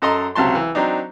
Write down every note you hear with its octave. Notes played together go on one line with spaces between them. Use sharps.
F#2 A4 D#5 A#5 C6
C#2 C3 F#3 A5 C6
E3
F#3 C4 D4 D#4